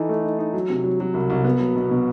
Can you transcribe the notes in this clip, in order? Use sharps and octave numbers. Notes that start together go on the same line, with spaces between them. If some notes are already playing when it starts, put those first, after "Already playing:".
Already playing: E3 D#4 A4
A3
D#4
D#4
F#3
C3
F#3
F#3
C2
C2
B3
F#3
B2
B2